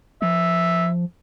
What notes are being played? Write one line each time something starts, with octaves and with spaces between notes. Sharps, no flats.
F3 E5